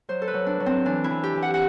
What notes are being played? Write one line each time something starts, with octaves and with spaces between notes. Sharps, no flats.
F#3 C5
A4
B4
F#3
D4
F#3
C4
E3 D4
E4
E3
G4
E3
F#5
F#5